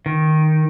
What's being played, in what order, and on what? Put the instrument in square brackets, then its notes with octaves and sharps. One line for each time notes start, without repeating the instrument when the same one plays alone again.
[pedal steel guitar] D#3